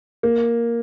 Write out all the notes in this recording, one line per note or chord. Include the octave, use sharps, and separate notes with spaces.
A#3